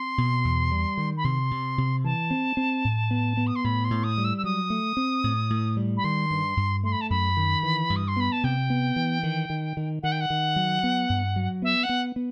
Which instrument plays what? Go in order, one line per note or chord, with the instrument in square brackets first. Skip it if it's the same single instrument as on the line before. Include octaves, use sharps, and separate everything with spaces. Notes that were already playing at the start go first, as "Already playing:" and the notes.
Already playing: [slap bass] C4 [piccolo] C6
[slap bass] B2
E2
G3
D#3
[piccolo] B5
[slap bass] C3 [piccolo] C6
[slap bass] C3
C3
[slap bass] E3 [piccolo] A5
[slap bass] C4
C4
A2
B3
B3
[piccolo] D#6
C6
[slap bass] A2 [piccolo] B5
[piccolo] C6
[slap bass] A2
[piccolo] D#6
[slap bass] G3
[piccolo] E6
E6
[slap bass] F#3 [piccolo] D#6
[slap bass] A3
C4
A2
A2
G3
[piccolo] B5
[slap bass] D#3 [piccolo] C6
[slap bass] G2
G2
[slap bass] A3 [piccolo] C6
[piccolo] B5
A5
[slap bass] F#2 [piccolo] B5
[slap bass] D#3
E3
G2
[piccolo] D#6
C6
[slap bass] B3 [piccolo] B5
[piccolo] A5
[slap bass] C3 [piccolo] G5
[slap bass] B3
E3
D#3
D#3
D#3
[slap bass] D#3 [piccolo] F#5
[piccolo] G5
F#5
[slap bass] D#3
F#3
B3
G2
F#3
[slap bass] B3 [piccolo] E5
[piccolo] F#5
[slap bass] B3
B3